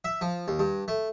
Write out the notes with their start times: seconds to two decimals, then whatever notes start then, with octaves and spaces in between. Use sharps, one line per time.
0.04 E5
0.21 F3
0.48 D#2
0.59 G2
0.88 A3